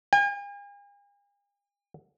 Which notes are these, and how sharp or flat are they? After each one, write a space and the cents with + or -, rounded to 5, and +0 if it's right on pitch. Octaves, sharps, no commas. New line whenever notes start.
G#5 -45